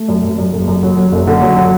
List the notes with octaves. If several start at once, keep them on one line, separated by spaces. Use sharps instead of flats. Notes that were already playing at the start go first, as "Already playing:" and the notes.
Already playing: A3
F#2
F#2
F#2
F#1
F#2
F#3
F#3
F#1
D3
F#3
F#3